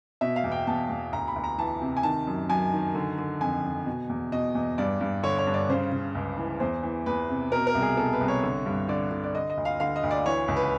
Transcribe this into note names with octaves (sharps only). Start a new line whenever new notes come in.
B2 E5
F5
E2
G5
E2 A5
E2
D2 A#5
B5
D2
A#5
E3 A5
C3
G#5
D#3 A5
F#2
F#2 G#5
D#3
D3
D3
F2 G#5
F2
B2
E2
B2 D#5
E2
G2 D5
G2
D3 C#5
C#5
G2
D5
C#3 C5
C#3
C#2
E3
E2 C5
E3
E2 B4
C3
B2 A#4
A#4
C2
G#4
B2 A4
B4
C2
C#5
D3
G2
D3 D5
D3
D5
D3 D#5
D#5
D2
F5
D3 F5
D#5
D2
D5
E3 C#5
C#2
B4